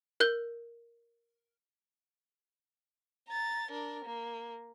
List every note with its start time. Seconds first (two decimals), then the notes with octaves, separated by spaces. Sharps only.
0.20 A#4 F#6 G6 G7
3.28 A#5 A6
3.70 D4 A#4
4.05 A#3